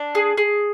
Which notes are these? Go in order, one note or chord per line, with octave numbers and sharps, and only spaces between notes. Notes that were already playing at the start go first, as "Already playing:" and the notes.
Already playing: D4
G#4
G#4